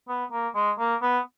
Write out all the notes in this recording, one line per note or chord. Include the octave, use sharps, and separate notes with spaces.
B3
A#3
G#3
A#3
B3